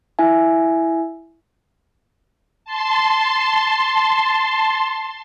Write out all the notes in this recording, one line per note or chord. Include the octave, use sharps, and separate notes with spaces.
E4 E5 G#5
A5 C6